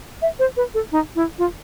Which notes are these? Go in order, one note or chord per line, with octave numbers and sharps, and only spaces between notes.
E5
C5
B4
A4
D#4
E4
F4